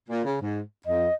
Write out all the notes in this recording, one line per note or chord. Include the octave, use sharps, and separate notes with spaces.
A#2
C#3
G#2
F2 D#5